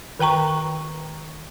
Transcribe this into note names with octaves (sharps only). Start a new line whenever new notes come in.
D#3 B4 G5 A#5 C#6